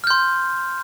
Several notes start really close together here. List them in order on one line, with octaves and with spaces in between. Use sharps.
F6 G6 C6